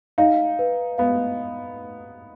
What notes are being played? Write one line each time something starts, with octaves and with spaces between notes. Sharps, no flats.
D#4 F5
B4
B3 F5